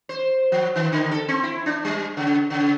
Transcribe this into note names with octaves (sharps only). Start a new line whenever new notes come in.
C5
F3
D#3
D3
A4
C4
E4
D4
G3
C#3
C#3